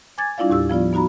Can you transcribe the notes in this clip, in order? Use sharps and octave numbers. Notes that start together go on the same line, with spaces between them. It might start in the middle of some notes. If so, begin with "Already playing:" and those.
G#5 D6 G#6 A6
G3 D4 E4 F4 D5 F5
D#2 A2 G4 E6
F3 B3 F4 D5
B3 D#4 F#4 A#5 B5